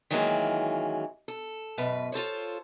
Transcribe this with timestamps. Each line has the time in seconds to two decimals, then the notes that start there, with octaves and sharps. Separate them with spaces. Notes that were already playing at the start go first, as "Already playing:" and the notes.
0.11 D#3 E3 F#3 G#3 A#3 C#4
1.28 A4
1.78 F#2 B2 B4
2.12 F4 A4 C5 C#5